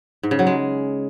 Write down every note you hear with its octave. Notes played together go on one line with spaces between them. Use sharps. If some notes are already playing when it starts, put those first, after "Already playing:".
G#2
C#3
F#3
G#3